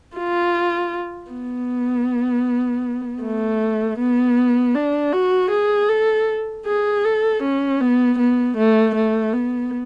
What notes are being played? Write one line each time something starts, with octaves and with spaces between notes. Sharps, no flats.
F4
B3
A3
B3
D4
F#4
G#4
A4
G#4
A4
C#4
B3
B3
A3
A3
B3